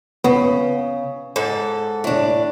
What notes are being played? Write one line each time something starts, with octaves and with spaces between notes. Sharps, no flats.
C#3 B3
G#2 A4
A2 D4